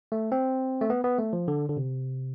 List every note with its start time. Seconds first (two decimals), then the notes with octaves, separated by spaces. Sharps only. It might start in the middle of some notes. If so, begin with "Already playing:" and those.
0.12 A3
0.32 C4
0.81 A3
0.90 B3
1.04 B3
1.19 A3
1.33 F3
1.48 D3
1.69 D3
1.77 C3